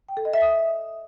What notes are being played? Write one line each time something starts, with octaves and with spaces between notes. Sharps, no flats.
G5
A4
D#5
E5
D#6